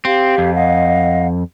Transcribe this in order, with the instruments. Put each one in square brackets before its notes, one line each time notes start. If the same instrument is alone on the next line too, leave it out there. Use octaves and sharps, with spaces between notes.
[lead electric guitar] C4 [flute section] G4 F5
[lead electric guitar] F2
[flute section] D#5 F5 F#5